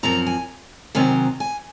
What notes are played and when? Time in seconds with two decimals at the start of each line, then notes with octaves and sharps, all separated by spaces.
0.03 F#2 F3 C4 A#5
0.26 G#5
0.95 C3 D#3 F#3 C4 G#5
1.40 G#5